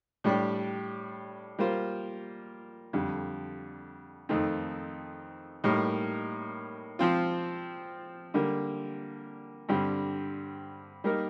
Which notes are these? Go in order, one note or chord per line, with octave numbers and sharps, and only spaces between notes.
A2 G3 D4 G4
G3 A#3 F4 C5
F2 D3 G3
F2 D#3 A3 C4 D#4
A2 G3 A#3 D#4 A#4
F3 C4 F4
D3 G3 A#3
G2 D3 G3 C4
G3 A#3 D#4 A#4